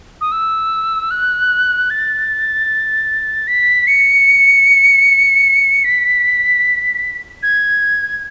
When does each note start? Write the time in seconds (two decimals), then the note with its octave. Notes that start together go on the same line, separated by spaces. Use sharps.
0.21 D#6
0.32 E6
1.11 F#6
1.90 A6
3.47 B6
3.87 C#7
5.84 B6
7.43 G#6